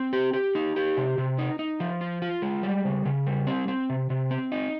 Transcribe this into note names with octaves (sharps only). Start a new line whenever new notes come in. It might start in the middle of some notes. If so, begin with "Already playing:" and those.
Already playing: C4
G4
G4
D#4
G4
C3
C3
D#4
D#4
F3
F4
F4
G#3
G3
C#3
C#3
G3
C4
C4
C3
C3
C4
D#4